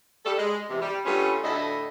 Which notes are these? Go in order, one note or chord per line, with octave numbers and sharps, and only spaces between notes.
G3 A4
G#3
E2 C3
G3
G2 G3 A3 B3 C#4 F4
D2 A2 D3 E4 A4 D#5